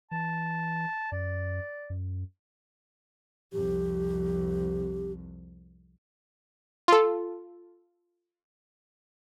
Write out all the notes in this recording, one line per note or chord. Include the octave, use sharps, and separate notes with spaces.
E3 A5
F#2 D5
F#2
C2 F2 G4
F4 A4